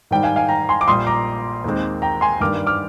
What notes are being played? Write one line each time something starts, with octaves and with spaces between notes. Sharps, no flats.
G#2 D#3 G3 G5
F5 G#5
F5 G#5
G5 A#5
G#5 C6
D6
A#1 A#2 G3 C6 D#6
A#5 D6
D#2 D#3 G#3 C4
G5 A#5
G#5 C6
G2 D#3 G3 A#3 D4 D6 F6
D6 F6